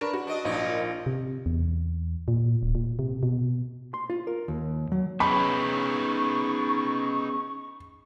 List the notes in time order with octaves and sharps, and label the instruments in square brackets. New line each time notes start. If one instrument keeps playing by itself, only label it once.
[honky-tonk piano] D4 A#4 B4 [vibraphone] C#6
[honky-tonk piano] F#4
[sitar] D4 D#5
[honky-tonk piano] A#1 [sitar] F#2 D4 D#4
[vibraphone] F4 A#4
[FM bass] C3
E2
A#2
D1
A#2
C3
B2
[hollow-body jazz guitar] C6
F4
A#4
D#2
F#3
[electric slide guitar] B3 C#4 G#4 [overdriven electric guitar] D#4 B4 [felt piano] B5 [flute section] C#6